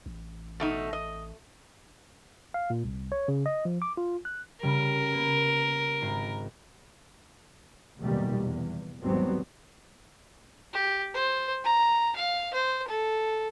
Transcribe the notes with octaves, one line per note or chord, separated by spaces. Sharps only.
A1
B2 A3 D#4
D#5
F5
A#2
C2
C#5
C#3
D#5
F3
D6
F4
F#6
C#3 G3 A#4
A#3 B3
G#1 A#5 C7
F1 B1 E2 A#2 D#3 G3
E2
G#1 E2 F#3 G3 B3 C4
G4
C5
A#5
F5
C5
A4